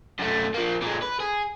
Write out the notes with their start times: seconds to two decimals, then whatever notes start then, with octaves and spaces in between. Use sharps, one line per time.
0.19 F#2 A3
0.54 F3 A#3
0.82 A#2 G#3
1.02 B4
1.20 G#4